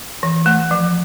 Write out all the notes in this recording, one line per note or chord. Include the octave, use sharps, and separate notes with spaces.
E3
A3
F3